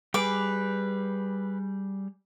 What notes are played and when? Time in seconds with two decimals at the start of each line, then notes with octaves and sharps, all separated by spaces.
0.14 G3 G#4 B4 D6